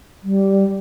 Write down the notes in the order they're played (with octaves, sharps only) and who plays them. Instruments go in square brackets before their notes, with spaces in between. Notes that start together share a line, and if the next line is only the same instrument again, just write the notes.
[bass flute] G3